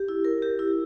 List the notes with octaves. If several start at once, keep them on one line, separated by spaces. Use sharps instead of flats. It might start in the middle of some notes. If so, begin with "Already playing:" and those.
Already playing: G4
E4
A#4
G4
E4